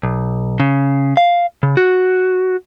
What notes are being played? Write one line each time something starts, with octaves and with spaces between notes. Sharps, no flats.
B1
C#3
F5
C#3
F#4